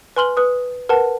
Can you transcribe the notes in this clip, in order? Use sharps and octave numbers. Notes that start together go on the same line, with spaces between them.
B4 G#5 C6 F6 F#7 G7
B4 D#6
A#4 B4 F#5 A5